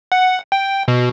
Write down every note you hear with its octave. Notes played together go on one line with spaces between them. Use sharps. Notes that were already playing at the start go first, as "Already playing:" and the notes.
F#5
G5
B2